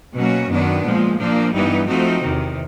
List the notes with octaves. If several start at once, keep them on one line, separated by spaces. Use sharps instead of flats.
B2 F#3 A#3 C#4 F#4
F#2 D#3 F#3 B3 D4
A#2 F3 G#3
A#2 F3 A#3 D4
G2 E3 G3 B3 D#4
F3 A3 C4 D#4 F#4
E2 C3 D#3